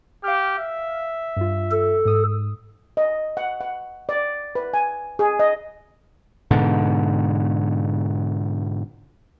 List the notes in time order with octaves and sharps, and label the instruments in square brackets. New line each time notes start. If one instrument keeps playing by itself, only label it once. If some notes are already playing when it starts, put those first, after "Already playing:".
[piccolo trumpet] G4 [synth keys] F5 F6
[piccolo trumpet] E5
[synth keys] G2 F4
[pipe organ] A4
[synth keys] G#2 D#6 E6
[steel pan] D#5
F#5
F#5
D5
B4
G#5
G#4
D#5
[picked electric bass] G#2 B2 D3